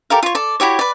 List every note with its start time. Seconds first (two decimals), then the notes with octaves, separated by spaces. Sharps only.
0.10 G4 A4 A#4 F5
0.23 F4 C#5
0.35 A4 D5
0.60 E4 F#4 G4 C#5
0.79 B4 D5